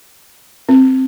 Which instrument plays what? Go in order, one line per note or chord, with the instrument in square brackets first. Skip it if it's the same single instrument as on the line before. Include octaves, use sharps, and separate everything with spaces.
[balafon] C4